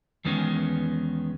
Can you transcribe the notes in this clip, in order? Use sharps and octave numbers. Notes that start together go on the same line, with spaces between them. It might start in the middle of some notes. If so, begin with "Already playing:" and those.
E2 D#3 G#3 B3 C#4